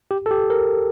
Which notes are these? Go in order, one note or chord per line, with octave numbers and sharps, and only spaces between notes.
G4
A4
G4
A#4